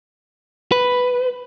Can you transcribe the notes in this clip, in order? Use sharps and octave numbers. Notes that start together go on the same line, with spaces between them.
B4